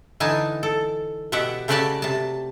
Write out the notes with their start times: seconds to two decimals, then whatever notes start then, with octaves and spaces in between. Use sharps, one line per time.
0.20 D3 E3 D#4 G#5 A5
0.63 A4
1.32 B2 G4 E5 F#5
1.68 C#3 A3 F#4 G4 D5 A5
2.02 C3 A5